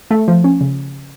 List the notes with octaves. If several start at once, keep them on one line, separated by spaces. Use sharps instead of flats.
A3
F3
C#4
C#3